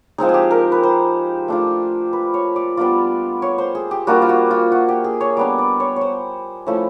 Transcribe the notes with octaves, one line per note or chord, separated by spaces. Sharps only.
F3 G#3 C4 D#4 G#4
G#4
G4
A#4
B4
C5
A3 D4 F4
B4
C#5
D5
G3 B3 D4 F4 D5
C#5
C5
G#4
G4
G3 A#3 D4 F4 F#4
F4
F#4
F4
F#4
G4
G#4
C#5
G3 B3 D4 D5
D5
C#5
C#5
C5
F3 A3 C#4 E4